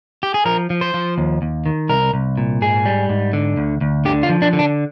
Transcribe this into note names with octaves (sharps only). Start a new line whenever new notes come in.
G4
G#4
F3 A#4
F3
C5
F3
D#2
D#2
D#3
C2 A#4
C2
A#2
G#2 G#4
G3
G#2
D3
D2
D2
D3 G4
F4
F3
D4
D3
D4